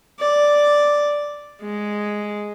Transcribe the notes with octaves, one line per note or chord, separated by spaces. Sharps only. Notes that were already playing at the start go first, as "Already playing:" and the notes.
D5
G#3